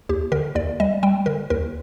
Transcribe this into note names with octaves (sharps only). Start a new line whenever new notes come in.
D#2 G4
D3 A#4
D#2 D5
G3 D#5
G3 G5
D3 A#4
D#2 A#4